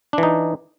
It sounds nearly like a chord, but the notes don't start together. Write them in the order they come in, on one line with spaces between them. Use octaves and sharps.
D4 E3 D#4